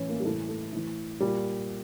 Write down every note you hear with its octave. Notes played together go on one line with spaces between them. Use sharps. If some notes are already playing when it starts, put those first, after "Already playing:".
Already playing: A2 E3 C#4
A#3
G3
A2 E3 A3
A3
A2 E3
A#2 G3